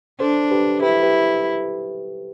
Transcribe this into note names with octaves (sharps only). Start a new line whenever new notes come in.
D4 A4 C5
G4 B4
E4 G4 B4
G4 B4